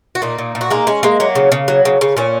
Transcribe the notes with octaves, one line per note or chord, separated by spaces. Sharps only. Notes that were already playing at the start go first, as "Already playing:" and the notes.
F#4
A#2 A#3 D#4
A#2
A#2
F#4
G#3 A#3 D#4
G#3 C#4
G#3 A#3
F#3 A#3
C#3
C#3
F#3
C#3
C#3
A#2 C#4